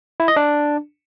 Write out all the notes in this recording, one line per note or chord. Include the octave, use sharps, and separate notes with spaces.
E4
D#5
D4